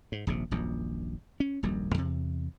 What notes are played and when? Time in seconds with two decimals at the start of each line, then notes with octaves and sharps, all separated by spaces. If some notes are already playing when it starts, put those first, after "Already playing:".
0.12 G#2
0.27 D#1 A#1 C3
0.51 D#1 A#1 F#2
1.40 C#4
1.63 D#1 A#1 F#2 G3
1.94 E2 C3